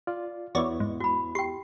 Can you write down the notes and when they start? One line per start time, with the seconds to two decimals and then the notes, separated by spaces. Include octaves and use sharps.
0.07 F4 D5
0.55 E2 B3 E4 F#4 C#5 D5
0.80 G#2
1.00 F#4 B5
1.35 G4 G5 C6